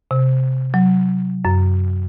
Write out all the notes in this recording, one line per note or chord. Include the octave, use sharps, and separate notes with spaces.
C3
F#3
F#2